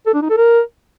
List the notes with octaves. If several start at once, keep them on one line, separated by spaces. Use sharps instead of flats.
A4
D4
D#4
A4
A#4